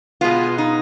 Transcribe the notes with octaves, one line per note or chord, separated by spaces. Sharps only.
B2 G#3 B3 F4
D#4